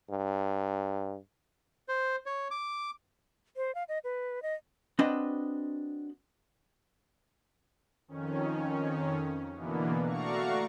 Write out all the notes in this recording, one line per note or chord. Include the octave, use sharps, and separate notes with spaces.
G2
C5
C#5
D6
C5
F5
D#5
B4
D#5
C4 D4 F#4 B4 D#5
F2 D#3 C#4
B2 D3 E3 A#3 B3
A3 F#4 D5 F5 A#5 C#6